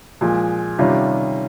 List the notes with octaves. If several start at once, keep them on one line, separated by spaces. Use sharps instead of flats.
A#2 F3 G#3
C3 D#3 G3 C#4 F4